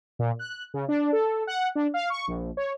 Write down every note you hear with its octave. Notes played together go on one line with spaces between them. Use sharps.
A#2
F#6
C#3
D4
A4
F#5
D4
F5
C#6
A#1
C#5